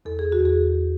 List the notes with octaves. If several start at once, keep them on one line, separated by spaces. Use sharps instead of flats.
E2 A4
G#4
F#4
E2 G#4